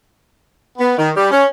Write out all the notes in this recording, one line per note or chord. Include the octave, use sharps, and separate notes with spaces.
B3
D#3
G3
C#4